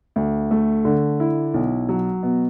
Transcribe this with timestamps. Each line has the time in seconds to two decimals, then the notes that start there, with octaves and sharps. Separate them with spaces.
0.16 D2
0.51 A3
0.85 D3
1.20 E4
1.54 B1
1.89 F#3
2.23 B2